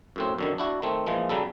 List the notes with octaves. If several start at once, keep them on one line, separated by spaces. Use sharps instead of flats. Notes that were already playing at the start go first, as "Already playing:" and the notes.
F#2 A2 C4
F#2 D3 D#3
D4 E4 F#4
D#3 A3 C4
A#2 E3 F3 G#3
C#3 F#3 G3 A4